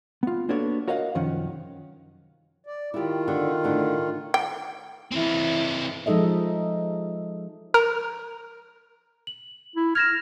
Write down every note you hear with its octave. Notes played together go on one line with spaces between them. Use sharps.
B3 F4
A#3 B3 D4 F#4 A4 C#5
F#4 A#4 C#5 D#5 F5 F#5
C2 F#2 D#3 F3 C#4 F#5
D5
D#3 E4 F4 G4
D3
A2 D3
G5
E3 C4 E4
F3 G#3 D#4 A4 D#5 E5
A#4
F#7
E4
F6 G#6 A#6 E7